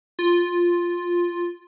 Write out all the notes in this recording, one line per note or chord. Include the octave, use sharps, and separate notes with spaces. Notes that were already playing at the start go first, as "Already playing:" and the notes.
F4